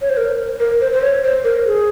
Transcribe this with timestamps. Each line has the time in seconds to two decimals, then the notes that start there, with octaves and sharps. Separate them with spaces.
0.01 C#5
0.10 C5
0.17 A#4
0.60 A#4
0.81 C5
0.93 C5
1.02 C#5
1.24 C5
1.44 A#4
1.66 G#4